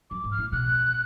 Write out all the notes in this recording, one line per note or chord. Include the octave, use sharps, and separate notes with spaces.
F#2 D6
G#2
F6
A2
B2 F#6